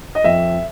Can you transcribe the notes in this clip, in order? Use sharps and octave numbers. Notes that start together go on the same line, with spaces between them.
D#5
F2 E5